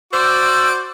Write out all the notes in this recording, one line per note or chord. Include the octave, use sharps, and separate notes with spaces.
F#4 C5 D5 D6 E6 F#6 G6